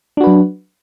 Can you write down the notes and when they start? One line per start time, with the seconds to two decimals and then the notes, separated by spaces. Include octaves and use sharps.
0.17 D4
0.20 F#4
0.24 B4
0.27 F#3